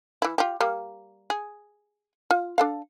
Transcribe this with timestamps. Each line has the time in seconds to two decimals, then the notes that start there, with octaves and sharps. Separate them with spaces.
0.22 E3 E4
0.38 F4 G4
0.60 G3 A#3
1.30 G#4
2.31 F4
2.58 D4 A4 F5